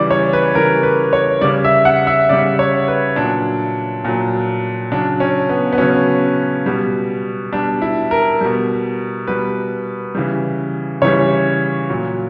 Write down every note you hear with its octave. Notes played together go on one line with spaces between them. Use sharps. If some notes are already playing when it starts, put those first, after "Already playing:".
Already playing: C#3 E3 G3 D5
C#5
B4
C#3 E3 G3 A#4
B4
C#5
C#3 G3 D5
E5
F#5
E5
C#3 G3 D5
C#5
B4
A#2 F#3 D4
A#2 F#3
C#3 F#3 D4
C#4
B3
B3
C#3 F#3 C#4
B2 G3
B2 G3 D4
E4
A#4
B2 G3
B2 G3 B4
C#3 E3 G3
C#3 E3 G3 C#5
A#2 F#3